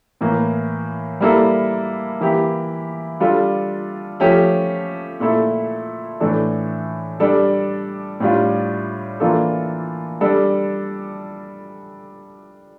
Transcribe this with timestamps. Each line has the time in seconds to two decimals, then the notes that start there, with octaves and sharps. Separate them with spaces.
0.21 A2 E3 A#3
1.20 G3 A#3 E4 A4
2.21 E3 A#3 E4 G4
3.20 G3 D4 F4 A4
4.20 F3 A3 C#4 G4
5.20 A#2 A3 E4 A4
6.20 A2 E3 A3 D4 A4
7.20 G3 D4 A4
8.20 A2 G3 D4 F4
9.20 E3 A#3 D4 F4 A4
10.21 G3 D4 A4